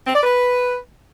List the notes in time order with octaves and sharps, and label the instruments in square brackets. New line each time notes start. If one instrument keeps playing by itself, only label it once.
[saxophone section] C4
D5
B4